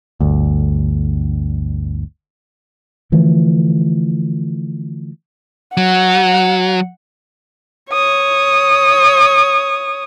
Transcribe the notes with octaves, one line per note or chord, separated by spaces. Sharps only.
G1 D2
D3 E3 F3 A3
F#3 F#5
C#5 D#6